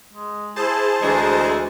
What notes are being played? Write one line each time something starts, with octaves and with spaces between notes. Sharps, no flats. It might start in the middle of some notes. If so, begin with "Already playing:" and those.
G#3
E4 G#4 C5 A5
D2 E3 G#3